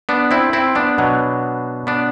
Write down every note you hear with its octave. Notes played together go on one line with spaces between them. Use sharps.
B3 D4
C4 E4
C4 E4
B3 D4
B2 F#3
B3 D4